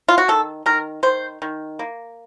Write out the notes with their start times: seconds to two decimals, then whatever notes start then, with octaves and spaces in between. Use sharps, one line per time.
0.08 F4
0.18 F#4
0.28 D#3 A4
0.66 D#3 A#4
1.03 D#3 C5
1.42 D#3
1.79 A#3